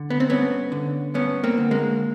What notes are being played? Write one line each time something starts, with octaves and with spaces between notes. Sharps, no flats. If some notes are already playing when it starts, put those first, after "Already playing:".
Already playing: D3
B3
C4
G2 B3 C#4
D3
G2 B3 C#4
A#3 C4
D3
G#3 A#3